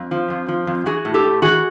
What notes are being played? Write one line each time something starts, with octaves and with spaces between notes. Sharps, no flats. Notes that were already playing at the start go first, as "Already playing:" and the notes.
Already playing: F2
F3
F2
F3
F2
E3 F#4 G#4
A2
G4 A4
A2
E3 F#4 G#4